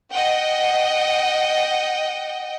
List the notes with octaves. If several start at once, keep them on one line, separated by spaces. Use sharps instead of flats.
D#5 F#5 G5